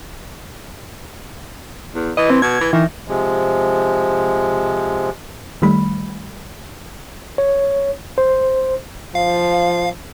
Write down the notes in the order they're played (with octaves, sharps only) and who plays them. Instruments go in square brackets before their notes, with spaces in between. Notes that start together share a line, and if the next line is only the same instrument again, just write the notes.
[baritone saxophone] E2
[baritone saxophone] E3 [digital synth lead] D#5
[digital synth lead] C4
[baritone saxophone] B2 [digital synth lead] G#6
[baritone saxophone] E3
[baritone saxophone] D#3 [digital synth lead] E3
[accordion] C3 F3 G#3
[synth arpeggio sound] D#3 G3 A3 B5
[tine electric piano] C#5
C5
[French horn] F3 [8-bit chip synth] F5